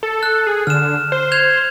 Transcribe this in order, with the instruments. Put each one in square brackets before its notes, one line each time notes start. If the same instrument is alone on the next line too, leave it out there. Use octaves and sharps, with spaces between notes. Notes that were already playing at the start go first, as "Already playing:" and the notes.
[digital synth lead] A4
[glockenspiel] F#6
[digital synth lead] G#4
[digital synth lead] D3 [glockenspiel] F6 E7
[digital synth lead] C5
[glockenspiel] G6 G#6 F7